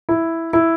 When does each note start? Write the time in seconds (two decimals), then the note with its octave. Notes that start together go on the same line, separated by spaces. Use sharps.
0.09 E4
0.53 E4